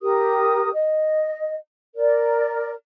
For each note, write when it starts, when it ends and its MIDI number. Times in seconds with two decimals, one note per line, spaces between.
0.02 0.70 67
0.02 0.70 70
0.02 0.70 87
0.73 1.57 75
1.95 2.73 70
1.95 2.73 74